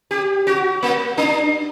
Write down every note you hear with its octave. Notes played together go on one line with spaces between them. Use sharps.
G4
F#4
A#3
D4